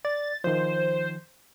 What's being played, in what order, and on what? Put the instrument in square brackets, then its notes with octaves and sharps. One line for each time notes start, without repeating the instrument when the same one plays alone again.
[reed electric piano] D5 [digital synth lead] A6
[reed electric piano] D#3 F3 [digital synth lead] C5